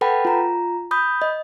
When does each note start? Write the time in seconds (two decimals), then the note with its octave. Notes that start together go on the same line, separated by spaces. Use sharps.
0.01 A4 B4 F#5 G5 A5 B5
0.25 F4 A#5
0.91 B5 D#6 G6
1.22 D#5